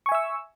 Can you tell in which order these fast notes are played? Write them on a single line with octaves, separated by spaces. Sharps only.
C#6 G#5 E5 E6